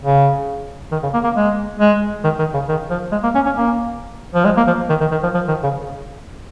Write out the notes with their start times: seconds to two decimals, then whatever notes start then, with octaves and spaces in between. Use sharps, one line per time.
0.03 C#3
0.92 D#3
1.03 C#3
1.14 A#3
1.24 A#3
1.35 G#3
1.79 G#3
2.24 D#3
2.39 D#3
2.54 C#3
2.69 D#3
2.90 F3
3.12 G#3
3.23 A#3
3.35 C#4
3.46 C#4
3.57 A#3
4.35 F3
4.45 G#3
4.57 A#3
4.67 F3
4.89 D#3
5.01 D#3
5.11 D#3
5.23 F3
5.34 F3
5.48 D#3
5.63 C#3